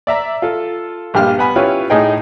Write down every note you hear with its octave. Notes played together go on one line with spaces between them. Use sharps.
D5 E5 A#5
F4 A4
A#1 G2 G4 F6
B3 F#5 G#5 B5
C#4 E4 F4 G4 B4 C#5
A2 D#4 G#4 D#5 G5